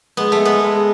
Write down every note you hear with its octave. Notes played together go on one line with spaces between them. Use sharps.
G#3 B3
A3
B3
G#3